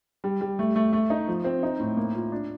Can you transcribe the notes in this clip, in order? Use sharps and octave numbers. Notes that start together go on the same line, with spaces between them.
G3
G3
A3
A3
A3
D#4
F3
C4
D#4
A2
A#3
F4
D4